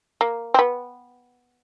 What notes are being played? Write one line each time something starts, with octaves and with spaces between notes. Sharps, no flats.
A#3
C4
B3